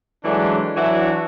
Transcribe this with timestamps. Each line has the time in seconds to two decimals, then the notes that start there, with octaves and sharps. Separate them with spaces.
0.23 E3 F#3 G#3 A3 C#4 D4
0.76 E3 F#3 D4 E4 F#4